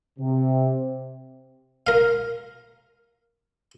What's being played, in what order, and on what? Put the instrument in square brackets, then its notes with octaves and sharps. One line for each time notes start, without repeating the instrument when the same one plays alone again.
[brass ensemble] C3
[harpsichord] A#4 F5